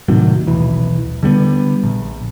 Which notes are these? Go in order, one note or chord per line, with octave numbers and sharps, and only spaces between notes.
A2 C3 D#3 F#3
D#1 B1 E3
D3 G3 G#3 B3
A#1